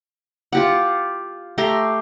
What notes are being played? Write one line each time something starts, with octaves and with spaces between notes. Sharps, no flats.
F4 G4 F#5
A3 G4 A#5 C6